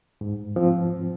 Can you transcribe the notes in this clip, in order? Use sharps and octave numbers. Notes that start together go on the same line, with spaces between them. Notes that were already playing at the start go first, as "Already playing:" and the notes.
G#2
F3 C4